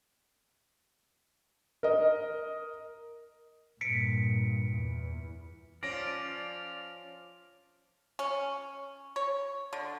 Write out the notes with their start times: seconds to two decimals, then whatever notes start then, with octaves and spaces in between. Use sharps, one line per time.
1.83 A#4 D#5
3.81 G2 A#2 B6 C#7 D7
4.74 E2
5.83 F3 C#4 D5 F6 A#6 D7
8.19 C#4
9.16 C#5
9.73 D3